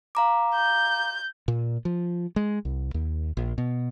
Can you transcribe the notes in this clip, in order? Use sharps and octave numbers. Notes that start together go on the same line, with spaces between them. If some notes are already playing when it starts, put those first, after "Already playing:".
F5 A#5 D6
G6
A#2
F3
G#3
C2
D#2
A#1
B2